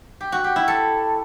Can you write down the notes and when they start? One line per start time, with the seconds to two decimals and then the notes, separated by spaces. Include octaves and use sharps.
0.21 G4
0.32 F#4
0.44 G4
0.56 E4
0.68 A4